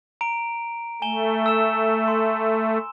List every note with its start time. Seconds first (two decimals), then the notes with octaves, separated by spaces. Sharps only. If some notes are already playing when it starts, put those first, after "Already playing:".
0.21 A#5 D7
1.02 A3 G#5 E7 G7
1.46 E6 E7
2.08 C6